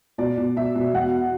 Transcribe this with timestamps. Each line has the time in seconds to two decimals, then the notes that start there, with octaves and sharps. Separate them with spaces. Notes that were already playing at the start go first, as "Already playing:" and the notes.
0.18 B2 D5
0.37 B2
0.56 B2 E5
0.75 B2
0.94 E2 F#5